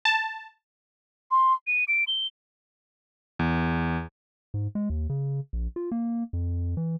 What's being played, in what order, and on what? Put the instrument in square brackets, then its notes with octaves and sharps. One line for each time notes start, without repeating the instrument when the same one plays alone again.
[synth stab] A5
[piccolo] C6
D#7
D7
G7
[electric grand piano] E2
[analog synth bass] G#2
G#3
D#2
C#3
A#1
F4
A#3
F2
E3